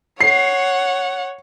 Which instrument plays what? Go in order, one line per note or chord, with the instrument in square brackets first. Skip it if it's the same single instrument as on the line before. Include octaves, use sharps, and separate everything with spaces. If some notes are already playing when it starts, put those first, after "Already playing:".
[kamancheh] C#5 F#5 [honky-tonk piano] C7